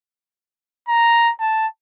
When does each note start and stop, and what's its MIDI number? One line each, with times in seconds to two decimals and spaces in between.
0.89 1.32 82
1.40 1.67 81